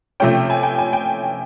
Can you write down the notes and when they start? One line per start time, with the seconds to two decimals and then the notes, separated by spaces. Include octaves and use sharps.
0.20 C3 F3 A3 C#4 G5
0.50 G#5
0.63 G5
0.78 G#5
0.93 G5